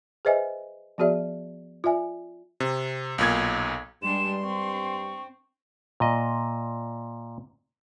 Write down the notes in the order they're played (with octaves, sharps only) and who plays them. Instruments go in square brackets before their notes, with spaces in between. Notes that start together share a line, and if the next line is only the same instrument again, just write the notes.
[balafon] G#4 B4 C5 D#5 E5 G#5
F3 B3 F#4 G#4 D5 E5
F4 D5 E5 G#5
[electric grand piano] C3
B1 A#2 G#6
[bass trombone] G2 [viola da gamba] G3 G#3 D4 [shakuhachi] C6 [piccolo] E7
[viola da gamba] C4 [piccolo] C#6
[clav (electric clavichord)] A#2 D#5